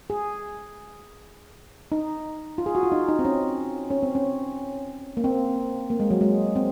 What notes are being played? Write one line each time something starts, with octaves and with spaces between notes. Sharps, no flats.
G#4
D#4
F4
G#4
F#4
F4
D#4
D#4
C4
C#4
C#4
C4
C#4
A#3
C4
A#3
G#3
F#3
G#3
C4